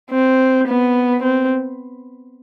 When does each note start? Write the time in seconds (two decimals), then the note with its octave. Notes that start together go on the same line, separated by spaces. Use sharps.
0.11 C4
0.68 B3
1.23 C4